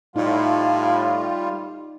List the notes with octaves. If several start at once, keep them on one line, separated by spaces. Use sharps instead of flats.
A2 G3 D#4 F4 F5